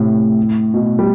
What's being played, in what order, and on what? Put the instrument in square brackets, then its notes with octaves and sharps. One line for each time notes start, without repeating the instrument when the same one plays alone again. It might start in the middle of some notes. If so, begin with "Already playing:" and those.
Already playing: [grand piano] A2 C3
B2
G3